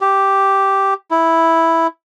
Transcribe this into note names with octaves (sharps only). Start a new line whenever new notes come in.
G4
E4